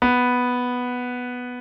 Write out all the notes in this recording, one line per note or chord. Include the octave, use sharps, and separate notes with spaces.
B3